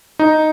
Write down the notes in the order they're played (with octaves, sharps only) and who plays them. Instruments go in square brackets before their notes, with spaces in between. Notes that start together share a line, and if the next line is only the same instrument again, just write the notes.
[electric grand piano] D#4